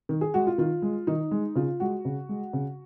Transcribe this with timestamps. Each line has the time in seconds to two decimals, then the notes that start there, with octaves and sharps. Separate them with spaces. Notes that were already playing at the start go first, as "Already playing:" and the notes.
0.09 D#3
0.21 G#4
0.34 G#3 F#4
0.47 F4
0.58 D#3 F4
0.82 G#3
1.07 D#3 D#4
1.31 G#3
1.56 C#3 F4
1.80 G#3 F#4
2.05 C#3
2.29 G#3
2.53 C#3